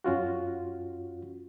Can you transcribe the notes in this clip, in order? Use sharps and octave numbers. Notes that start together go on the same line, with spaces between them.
F#2 C#4 F4 F#4